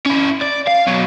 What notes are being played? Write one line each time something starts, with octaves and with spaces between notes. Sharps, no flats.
C#4 E4
D5
F5
B2 F#3